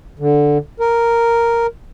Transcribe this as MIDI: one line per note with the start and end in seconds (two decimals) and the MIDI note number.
0.19 0.58 50
0.80 1.67 70